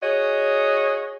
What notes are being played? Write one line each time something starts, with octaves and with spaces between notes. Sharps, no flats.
F#4 G#4 C#5 D#5